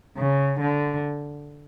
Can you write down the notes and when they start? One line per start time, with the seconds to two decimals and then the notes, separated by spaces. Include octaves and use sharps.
0.17 C#3
0.60 D3